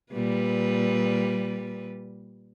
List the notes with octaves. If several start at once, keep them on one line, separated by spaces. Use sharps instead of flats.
A#2 G3 B4